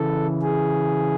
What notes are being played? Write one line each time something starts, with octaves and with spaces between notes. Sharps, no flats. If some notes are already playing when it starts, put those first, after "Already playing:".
Already playing: C#3 E3 A4
G#4